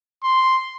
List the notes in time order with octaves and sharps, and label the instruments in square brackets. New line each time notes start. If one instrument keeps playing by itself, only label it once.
[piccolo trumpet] C6